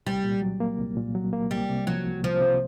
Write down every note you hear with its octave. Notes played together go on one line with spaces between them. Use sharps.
C2 G3
A#2
F#3
A#3
C2
A#2
F#3
A#3
C2 G3
C3
F3 F#3
C2
C2 F3
C3